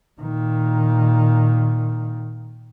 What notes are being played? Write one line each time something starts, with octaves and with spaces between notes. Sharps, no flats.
A#2 D#3